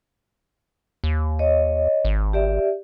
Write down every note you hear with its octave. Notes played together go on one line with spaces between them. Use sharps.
D#2
C#5 D#5
G#1
G4 D5 E5